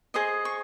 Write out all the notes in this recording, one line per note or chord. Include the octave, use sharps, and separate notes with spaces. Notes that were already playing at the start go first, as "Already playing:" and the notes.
G#4 C5 D#5 D#6
C#6